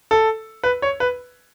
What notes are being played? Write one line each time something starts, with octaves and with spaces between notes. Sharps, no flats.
A4
B4
C#5
B4